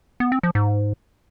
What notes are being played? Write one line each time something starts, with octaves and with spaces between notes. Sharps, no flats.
B3
C4
F3
G#2